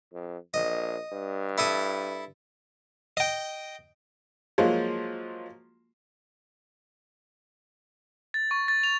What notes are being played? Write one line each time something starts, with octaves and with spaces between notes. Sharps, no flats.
F2
A#1 D#5
G2
E4 A4 D#6
D#5 G5
F3 F#3 G#3 A#3
A6
C#6
A6
F7